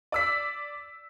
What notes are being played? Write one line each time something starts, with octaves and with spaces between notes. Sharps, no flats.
D5 E6 B6